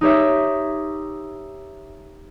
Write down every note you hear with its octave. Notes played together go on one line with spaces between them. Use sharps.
D#4 G4 C#5 E5